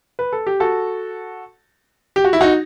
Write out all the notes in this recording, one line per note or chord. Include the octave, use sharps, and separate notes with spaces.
B4
A4
G4
F#4 A4
G4
F#4
E4
D#4 F#4